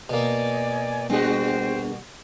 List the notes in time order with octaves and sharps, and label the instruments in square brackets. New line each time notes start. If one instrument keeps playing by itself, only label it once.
[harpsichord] B2 A#3 [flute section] D5 D#5 G#5
[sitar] G3 F#4 [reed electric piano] B3 D4 G#4 [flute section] C5 G5